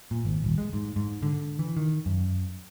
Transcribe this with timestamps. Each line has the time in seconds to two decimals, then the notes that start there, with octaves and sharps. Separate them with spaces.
0.11 A#2
0.25 G#1
0.44 D#1
0.58 G#3
0.73 G#2
0.96 G#2
1.23 D3
1.59 E3
1.77 D#3
2.06 F#2